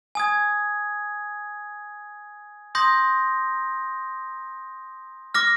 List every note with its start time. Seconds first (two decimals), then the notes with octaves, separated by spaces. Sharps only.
0.15 G#5 D#6 G#6
2.75 C6 D#6 G6 A#6
5.34 D6 F6 A#6